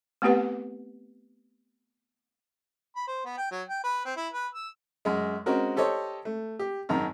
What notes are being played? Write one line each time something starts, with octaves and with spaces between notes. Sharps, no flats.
A3 B3 C4 G4 B4 F#5
B5
C5
B3
G5
F#3
G5
B4
C4
E4
B4
E6
F#2 G#3
G#3 C4 C#4 F#4 A#4
G4 A4 C5 C#5 D#5
A3
G4
G#1 F#2 D#3 A#5